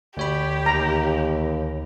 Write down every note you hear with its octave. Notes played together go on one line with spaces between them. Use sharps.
D2 G4 C#5 B5
D#2 A#5